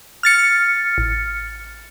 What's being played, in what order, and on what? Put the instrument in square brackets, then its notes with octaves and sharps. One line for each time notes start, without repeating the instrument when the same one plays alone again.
[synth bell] F6 A6 C#7
[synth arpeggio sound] A1